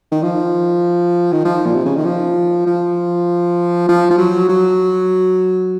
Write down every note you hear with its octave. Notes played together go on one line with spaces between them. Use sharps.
D#3
F3
D#3
F3
A#2
C3
C#3
D#3
F3
F3
F3
F3
F#3
F#3